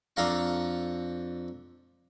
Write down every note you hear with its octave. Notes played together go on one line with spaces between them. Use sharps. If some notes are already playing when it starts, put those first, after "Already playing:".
F2 D4 A4 F5 A#5 C#6